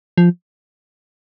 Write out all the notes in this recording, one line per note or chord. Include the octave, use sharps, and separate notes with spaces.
F3